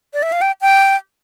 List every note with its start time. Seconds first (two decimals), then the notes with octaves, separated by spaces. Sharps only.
0.13 D5
0.23 E5
0.32 F5
0.41 G5
0.61 G5